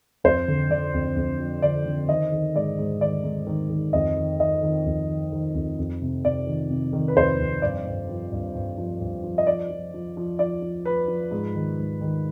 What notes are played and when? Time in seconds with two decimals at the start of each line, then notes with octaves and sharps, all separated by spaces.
0.24 F2 C5
0.48 D3
0.70 D3 D5
0.94 F2
1.16 F2
1.40 F3
1.62 D3 D5
1.86 D3
2.08 D#3 D#5
2.32 D#3
2.55 G#2 D5
2.79 G#2
3.01 D#3 D5
3.24 G#2
3.47 D#3
3.70 D#3
3.93 F2 D#5
4.16 D#3
4.40 D#3 D#5
4.62 D#3
4.86 F2
5.09 D#3
5.32 D#3
5.54 F2
5.79 F2
6.02 C3
6.24 C3 D5
6.47 D#3
6.70 C3
6.93 D#3
7.08 B4
7.17 F2 C5
7.39 F2
7.62 G2 D5
7.86 G2
8.09 F3
8.32 G2
8.55 G2
8.78 F3
9.01 G2
9.23 F3
9.38 D#5
9.47 F3 D5
9.70 F3
9.94 F3
10.17 F3
10.39 F3 D5
10.62 F3
10.85 F3 B4
11.08 F3
11.31 G#2
11.55 D#3
11.78 G#2
12.01 D#3